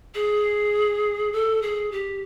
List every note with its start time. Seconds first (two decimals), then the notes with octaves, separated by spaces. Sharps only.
0.14 G#4
1.32 A4
1.62 G#4
1.91 G4